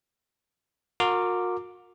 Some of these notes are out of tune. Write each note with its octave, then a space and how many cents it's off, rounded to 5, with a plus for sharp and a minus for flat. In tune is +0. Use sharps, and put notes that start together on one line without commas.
F#4 -40 A#4 -15 D6 +0